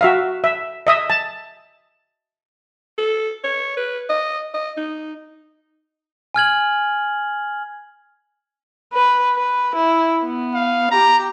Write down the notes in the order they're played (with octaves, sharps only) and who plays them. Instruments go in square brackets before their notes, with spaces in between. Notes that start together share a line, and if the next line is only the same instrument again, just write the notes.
[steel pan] F#4 E5 F5
E5
D#5 E5 D#6
A5
[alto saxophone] A4
C#5
B4
D#5
D#5
D#4
[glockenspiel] G#5 F6 G#6 F#7
[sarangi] B4
B4
E4
B3
[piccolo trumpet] F5
[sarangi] G4 [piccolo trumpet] A#5